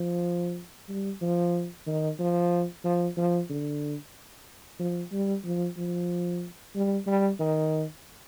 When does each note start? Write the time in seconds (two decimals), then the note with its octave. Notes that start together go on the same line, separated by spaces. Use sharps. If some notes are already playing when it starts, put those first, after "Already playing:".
Already playing: F3
0.89 G3
1.21 F3
1.87 D#3
2.19 F3
2.84 F3
3.17 F3
3.49 D3
4.79 F3
5.12 G3
5.44 F3
5.77 F3
6.75 G3
7.07 G3
7.39 D#3